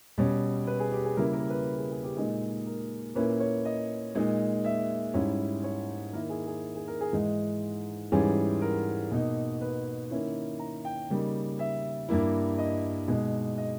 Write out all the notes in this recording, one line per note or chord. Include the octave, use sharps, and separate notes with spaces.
B2 G3 C#4
B4
G#4
G4
G#4
C#3 G3 A#3 E4 A#4
A#4
B4
G#4
G#4
G4
A#2 G#3 D#4 G#4
A#4
A#2 A#3 C#4 E4 B4
C#5
D#5
A#2 G#3 D#4
E5
G#2 G3 C#4 E4
C#5
D#3 A#3 E4 A#4
G#4
G#4
G#4
A#4
G#4
G#2 E3 G#3 D#4
G#2 E3 G3 C#4 G#4
A#4
B2 A#3 D#4
B4
D#3 A#3 C#4 E4
A#5
G5
C#3 G3 A#3 D#4
E5
G2 G3 A#3 E4
D#5
B2 G#3 D#4
D#5